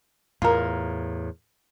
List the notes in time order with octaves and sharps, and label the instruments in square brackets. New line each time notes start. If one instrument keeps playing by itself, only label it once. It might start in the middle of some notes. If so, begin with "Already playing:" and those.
[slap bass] E2 A2 [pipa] F4 A#4